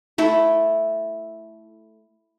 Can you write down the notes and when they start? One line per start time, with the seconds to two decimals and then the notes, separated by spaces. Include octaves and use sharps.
0.18 A3 E4 A4